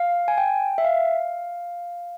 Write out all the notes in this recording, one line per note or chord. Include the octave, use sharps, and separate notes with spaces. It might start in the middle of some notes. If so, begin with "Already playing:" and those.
Already playing: F5
G#5
G5
E5
F5